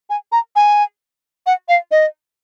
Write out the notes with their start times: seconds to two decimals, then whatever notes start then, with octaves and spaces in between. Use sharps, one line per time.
0.10 G#5
0.32 A#5
0.56 G#5
1.46 F#5
1.68 F5
1.91 D#5